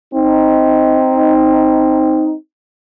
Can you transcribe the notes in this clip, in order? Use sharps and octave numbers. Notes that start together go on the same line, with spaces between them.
C4 D#4